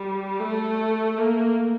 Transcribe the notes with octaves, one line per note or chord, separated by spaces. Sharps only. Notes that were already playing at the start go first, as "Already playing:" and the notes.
Already playing: G3
A3
A#3